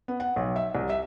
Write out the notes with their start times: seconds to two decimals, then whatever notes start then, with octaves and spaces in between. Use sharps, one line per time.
0.08 B3
0.20 F#5
0.36 B1
0.56 E5
0.75 C2
0.90 E5